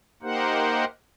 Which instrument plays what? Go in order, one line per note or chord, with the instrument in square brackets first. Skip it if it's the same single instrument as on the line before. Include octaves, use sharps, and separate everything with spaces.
[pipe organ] A#3 D#4 G4 A#4 C5 F#5